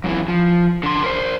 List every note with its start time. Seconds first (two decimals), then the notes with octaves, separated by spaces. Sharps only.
0.04 F#2 E3
0.28 F3
0.83 D3 C6
1.04 A#4 C5